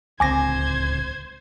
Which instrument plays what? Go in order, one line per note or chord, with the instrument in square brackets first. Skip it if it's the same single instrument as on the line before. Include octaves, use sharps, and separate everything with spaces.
[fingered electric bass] D1 C#2 C4 [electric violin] C5 G#6 [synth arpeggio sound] G#5 D6 A#6